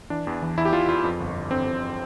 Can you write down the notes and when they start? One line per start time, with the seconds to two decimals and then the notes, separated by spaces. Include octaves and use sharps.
0.10 E3 D4
0.27 E2
0.42 E3
0.57 E2 E4
0.65 G4
0.73 E3 F4
0.88 E2 F4
1.04 F2
1.20 G1
1.36 G1
1.51 D3 C4
1.67 F2